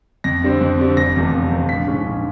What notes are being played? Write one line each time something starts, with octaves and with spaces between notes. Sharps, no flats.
F2 A#6
D3 G3 C4
F2
D3 G3 C4
F1 A#6
E2 C3 F3 A3
F1
E2 C3 F3 A3
A#1 B6
G#2 F3 G#3 C#4
A#1